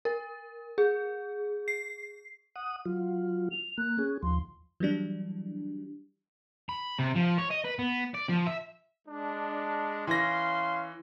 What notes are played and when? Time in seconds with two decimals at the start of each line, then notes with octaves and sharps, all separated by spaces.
0.05 A#4
0.78 G#4
1.68 C7
2.56 F#5 D#6
2.85 F#3 F4
3.51 F7
3.78 A#3 F#6
3.99 C#4 G#4
4.23 D#2 F3 C6
4.80 E3 F#3 G3 D4
6.69 B5
6.99 C3
7.16 F3
7.38 C#5
7.51 D#5
7.65 B4
7.79 B3
8.14 D5
8.29 F3
8.47 E5
9.07 G#3 D4
10.07 E3 C#4 F5 C6 A#6